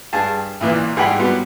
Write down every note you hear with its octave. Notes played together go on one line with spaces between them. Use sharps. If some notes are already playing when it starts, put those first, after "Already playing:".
G2 G#4 A5
B1 A#2 E3
G#1 G3 G#4 F#5 G5 B5
F#3 G3 B3